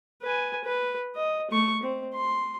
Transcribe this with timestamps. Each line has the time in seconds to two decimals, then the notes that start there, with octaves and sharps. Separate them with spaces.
0.23 B4 G#5
0.65 B4
1.16 D#5
1.51 A3 C#6
1.83 C4
2.14 C6